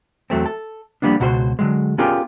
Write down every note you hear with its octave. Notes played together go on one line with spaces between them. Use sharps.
E2 F#3 A3 C4
A4
F3 G3 A#3 B3 D4
C#2 B2 F#4 G4 C5
D3 F#3 G#3
B3 C#4 F4 G4 G#4 A#4